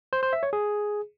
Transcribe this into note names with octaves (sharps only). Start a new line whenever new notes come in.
C5
C5
E5
C#5
G#4